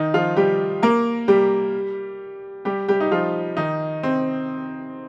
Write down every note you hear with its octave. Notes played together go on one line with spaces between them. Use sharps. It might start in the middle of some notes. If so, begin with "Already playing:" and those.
Already playing: D#3 D#4
F3 F4
G3 G4
A#3 A#4
G3 G4
G3 G4
G3 G4
D#4
F3 F4
D#3 D#4
C4